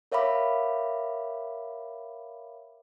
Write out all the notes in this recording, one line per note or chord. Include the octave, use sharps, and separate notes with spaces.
A#4 C#5 E5 F5 B5 D6